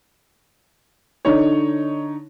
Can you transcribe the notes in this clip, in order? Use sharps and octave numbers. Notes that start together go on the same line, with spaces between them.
D3 D#4 C#5